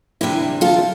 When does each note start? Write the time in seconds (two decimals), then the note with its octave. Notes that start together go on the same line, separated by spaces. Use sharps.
0.21 D2 C3 E3 E4 G4
0.61 F4 A4